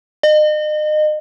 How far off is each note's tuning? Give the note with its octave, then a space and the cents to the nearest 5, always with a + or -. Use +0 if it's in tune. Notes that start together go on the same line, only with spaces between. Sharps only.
D#5 -35